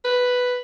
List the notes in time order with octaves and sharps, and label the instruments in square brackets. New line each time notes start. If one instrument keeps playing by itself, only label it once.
[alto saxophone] B4